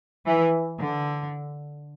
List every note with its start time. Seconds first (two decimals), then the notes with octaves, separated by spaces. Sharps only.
0.25 E3
0.78 D3